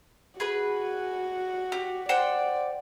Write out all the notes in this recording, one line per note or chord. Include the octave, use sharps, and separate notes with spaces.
F#4 G#4 B4
G4
C5 D5 F#5 G5